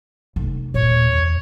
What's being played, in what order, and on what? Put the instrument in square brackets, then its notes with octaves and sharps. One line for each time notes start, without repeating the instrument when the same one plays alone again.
[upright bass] F1
[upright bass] D#2 [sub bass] A#2 [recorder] C#5
[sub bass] E2